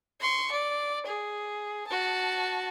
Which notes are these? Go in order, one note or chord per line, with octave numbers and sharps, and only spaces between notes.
C6 C#6
D5
G#4
F#4 A5